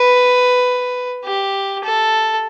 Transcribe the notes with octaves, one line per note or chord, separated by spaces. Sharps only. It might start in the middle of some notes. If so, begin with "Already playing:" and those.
Already playing: B4
G4
A4